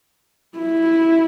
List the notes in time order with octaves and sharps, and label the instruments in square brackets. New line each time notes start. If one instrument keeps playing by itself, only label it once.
[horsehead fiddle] E4